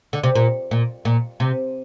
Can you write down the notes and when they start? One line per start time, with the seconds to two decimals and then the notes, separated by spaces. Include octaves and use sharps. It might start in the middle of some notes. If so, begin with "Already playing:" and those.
0.13 D3
0.23 C3
0.35 A#2
0.71 A#2
1.05 A#2
1.40 C3